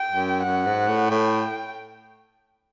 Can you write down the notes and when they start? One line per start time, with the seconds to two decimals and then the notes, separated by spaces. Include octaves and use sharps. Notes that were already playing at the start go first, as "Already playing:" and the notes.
Already playing: G5
0.11 F#2
0.44 F#2 F#5
0.66 G#2
0.88 A2
1.09 A2 G5